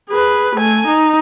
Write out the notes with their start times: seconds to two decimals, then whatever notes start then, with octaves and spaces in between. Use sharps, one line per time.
0.10 G#4 B4
0.56 A3 G#5
0.88 D#4